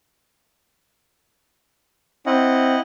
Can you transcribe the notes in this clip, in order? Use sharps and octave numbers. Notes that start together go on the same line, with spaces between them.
C4 E4 D#5 F#5